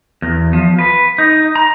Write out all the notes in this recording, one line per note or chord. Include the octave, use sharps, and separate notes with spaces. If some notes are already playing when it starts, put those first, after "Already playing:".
E2
F3
B4
D#4
A#5